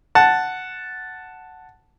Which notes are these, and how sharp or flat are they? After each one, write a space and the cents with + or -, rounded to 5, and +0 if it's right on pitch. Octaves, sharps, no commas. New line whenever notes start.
F#5 +0 A5 +0